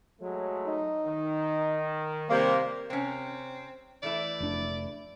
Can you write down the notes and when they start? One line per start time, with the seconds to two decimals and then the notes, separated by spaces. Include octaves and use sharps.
0.21 F#3 G#3 A3
0.66 D#4
1.06 D#3
2.29 C3 G3 A#3
2.90 C3 C4 C#4
4.03 E3 A3 E4 D5
4.40 F1 D4